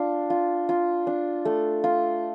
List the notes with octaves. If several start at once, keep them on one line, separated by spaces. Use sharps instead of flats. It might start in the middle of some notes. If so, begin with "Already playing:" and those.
Already playing: D4 F4
F4
F4
D4
A3
F4